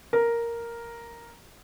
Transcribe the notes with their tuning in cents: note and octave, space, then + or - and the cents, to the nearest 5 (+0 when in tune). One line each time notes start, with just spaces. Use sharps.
A#4 +0